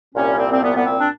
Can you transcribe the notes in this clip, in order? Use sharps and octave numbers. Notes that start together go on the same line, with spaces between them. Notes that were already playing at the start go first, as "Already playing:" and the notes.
C2 A#2 G3 C#4
C4
C4
B3
B3
C4
D4